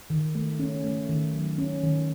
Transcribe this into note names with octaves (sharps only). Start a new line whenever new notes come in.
D#3
A3
C#4
A3
D#3
F#3
C#4
D#3